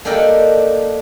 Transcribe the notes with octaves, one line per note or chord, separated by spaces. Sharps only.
A#3 D4 D#4 G4 A4 A#4